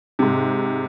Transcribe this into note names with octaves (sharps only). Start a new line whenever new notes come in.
G#2 C3